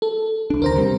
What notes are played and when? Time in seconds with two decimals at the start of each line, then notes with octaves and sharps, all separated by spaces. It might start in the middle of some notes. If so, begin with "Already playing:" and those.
0.02 A4
0.50 C2 D4
0.62 D#2 D3 A#4 C5 A#5
0.76 C3 G3